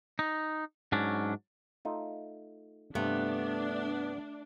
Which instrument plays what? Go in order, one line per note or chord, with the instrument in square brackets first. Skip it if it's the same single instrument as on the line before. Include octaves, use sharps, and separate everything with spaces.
[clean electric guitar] D#4
G#2 F#3 C#4 D4
[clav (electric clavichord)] A3 D#4 F4
[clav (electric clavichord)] G2 C3 [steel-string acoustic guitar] A3 [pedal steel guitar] B3 [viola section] D4